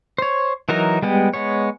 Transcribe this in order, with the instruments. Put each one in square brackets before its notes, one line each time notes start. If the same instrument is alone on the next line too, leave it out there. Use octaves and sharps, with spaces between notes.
[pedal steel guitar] C5 C#5
E3 F#3 D#4 A#4 A#5
G3 G#3 B3 G4
G#3 B3 C#5